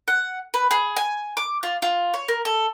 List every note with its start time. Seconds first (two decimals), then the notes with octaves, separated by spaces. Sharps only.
0.08 F#5
0.54 B4
0.71 G#4
0.96 G#5
1.37 D6
1.63 F4
1.82 F4
2.14 C#5
2.28 A#4
2.45 A4